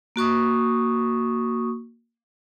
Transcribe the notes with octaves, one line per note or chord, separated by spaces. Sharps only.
A#3 F#4 C#6 D#6